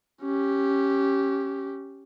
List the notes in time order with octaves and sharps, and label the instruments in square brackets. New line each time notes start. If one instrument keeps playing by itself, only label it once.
[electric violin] C#4 G4